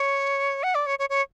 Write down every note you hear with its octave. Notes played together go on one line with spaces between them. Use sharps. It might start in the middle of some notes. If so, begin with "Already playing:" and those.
Already playing: C#5
F#5
D5
C#5
C#5
C#5